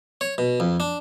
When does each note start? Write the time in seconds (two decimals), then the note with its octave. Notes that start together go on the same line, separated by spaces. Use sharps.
0.21 C#5
0.38 B2
0.60 F2
0.80 D4